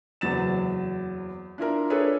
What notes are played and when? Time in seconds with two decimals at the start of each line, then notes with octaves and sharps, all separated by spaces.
0.21 F#1 E2 F#3 A6 E7
1.58 D4 E4 F4 A#4
1.90 D4 G#4 A4 B4 C#5